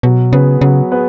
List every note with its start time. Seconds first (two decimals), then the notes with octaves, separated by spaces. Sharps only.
0.03 B2 F#3
0.32 C#3 B3 G#4 B4
0.61 C#3 F#3
0.91 B3 G#4 B4